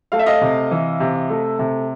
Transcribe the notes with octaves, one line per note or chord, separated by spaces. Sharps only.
A3 F5
E5
D#5 F5
C3
E3
C3
A3
C3